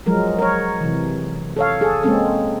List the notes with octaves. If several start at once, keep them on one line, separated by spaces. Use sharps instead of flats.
F3 F#3 G#3 A#4
A#4 C#5
C3 E3
A4 C#5 F5
G#4 A4
G#3 A#3 C4 C#4 A4